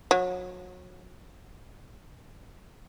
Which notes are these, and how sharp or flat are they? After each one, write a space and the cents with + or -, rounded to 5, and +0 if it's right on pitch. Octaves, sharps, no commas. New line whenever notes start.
F#3 -30